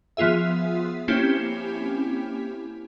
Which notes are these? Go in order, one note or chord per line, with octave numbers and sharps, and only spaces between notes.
F3 B3 F4 G#4 E5
A#3 C4 C#4 E4 G4